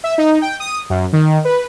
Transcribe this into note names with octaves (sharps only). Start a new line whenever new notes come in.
E5
D#4
G5
D#6
F#2
D#3
B4